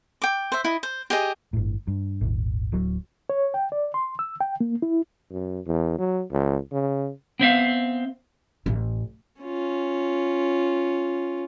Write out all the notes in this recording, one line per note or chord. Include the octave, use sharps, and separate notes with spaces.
G5 D6
C5 E5
E4 D#5
C5
G4 G#4 D#5
G1 A2
G2
D#1 G#1
D1 F#3
C#5
G5
D5
C6
E6
G5
A#3
E4
F#2
E2
F#3
C#2
C#3
B3 C4 E5 F5
A1
C#4 F4